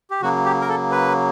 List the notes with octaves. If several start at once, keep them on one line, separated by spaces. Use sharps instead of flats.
G4
C#3 F#3 A#3 F#4
G4
A#4
A4
B4